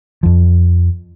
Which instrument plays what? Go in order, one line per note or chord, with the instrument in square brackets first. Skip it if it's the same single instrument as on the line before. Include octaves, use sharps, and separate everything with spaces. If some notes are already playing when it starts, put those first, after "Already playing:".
[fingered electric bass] F2 F3